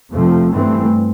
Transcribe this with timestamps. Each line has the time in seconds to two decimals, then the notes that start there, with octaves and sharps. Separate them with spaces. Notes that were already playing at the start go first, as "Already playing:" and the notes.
0.12 F2 C3 F3 A3
0.51 G2 E3 A3 C4